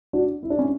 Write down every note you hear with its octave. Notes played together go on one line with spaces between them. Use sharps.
D4 F#4
E4
D4
C#4